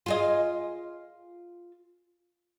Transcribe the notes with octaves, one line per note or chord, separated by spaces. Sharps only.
F4 G#4 D#5